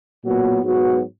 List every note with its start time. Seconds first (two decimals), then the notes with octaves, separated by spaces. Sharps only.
0.23 A#2 F#3 B3 F#4
0.62 G#2 F#3 B3 F#4